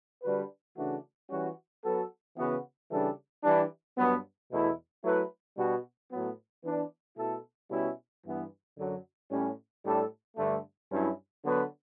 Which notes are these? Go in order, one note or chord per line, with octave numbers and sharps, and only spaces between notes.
D3 G3 D4 F#4 B4
C#3 E3 A3 D4 F#4
E3 G3 C#4 F#4
F#3 B3 F#4 A4
C#3 E3 B3 F#4 B4
C#3 E3 G3 D4 A4
E3 G3 D4
G2 F#3 B3
E2 B2 A3 E4
F#3 A3 E4 B4
B2 G3 D4 F#4
A2 F#3 B3
E3 B3 D4
B2 A3 E4 A4
B2 G3 C#4 E4
G2 E3 B3
F#2 D3 F#3
A2 G3 C#4
A2 G3 D4 A4
G2 D3 A3
G2 F#3 C#4 E4
D3 F#3 B3 F#4 B4